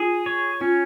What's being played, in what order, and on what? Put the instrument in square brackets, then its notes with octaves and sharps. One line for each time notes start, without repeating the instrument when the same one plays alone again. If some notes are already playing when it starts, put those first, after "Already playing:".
Already playing: [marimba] F4 [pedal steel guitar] G#4
[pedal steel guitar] C#5
[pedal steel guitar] C#4 [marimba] F4